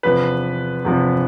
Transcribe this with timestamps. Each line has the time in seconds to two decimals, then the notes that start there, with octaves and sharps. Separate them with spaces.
0.03 E2 C3 F3 B4
0.85 E2 C3 F3